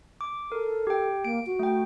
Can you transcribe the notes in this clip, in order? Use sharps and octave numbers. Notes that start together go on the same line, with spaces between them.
D6
A4 A#4
G4 G5
A#3 D7
F#4
A3 G5